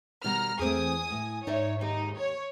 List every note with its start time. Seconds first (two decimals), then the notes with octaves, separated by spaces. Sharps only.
0.24 B2 D#3 G3 A#5 F6
0.59 E2 A3 C4 G#4 G#5 D#6
1.11 A2
1.47 G#2 D#4 C#5 D5 E5
1.81 D#2 D#4 G4
2.17 C#5